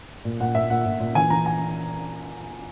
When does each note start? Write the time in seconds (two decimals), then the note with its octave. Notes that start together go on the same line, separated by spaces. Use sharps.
0.25 A#2
0.40 A#2 F#5
0.55 A#2 E5
0.70 A#2 F#5
0.86 A#2
1.00 A#2
1.15 E3 G#5
1.30 E3 A#5
1.46 G#5